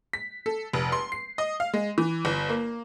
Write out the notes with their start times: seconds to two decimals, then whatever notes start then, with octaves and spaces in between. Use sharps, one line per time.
0.13 B6
0.46 A4
0.73 F1
0.92 C6
1.12 C7
1.38 D#5
1.60 F5
1.73 G#3
1.98 E3
2.25 G1
2.49 A#3